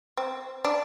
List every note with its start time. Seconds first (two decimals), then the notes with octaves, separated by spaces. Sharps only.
0.17 C4
0.65 D4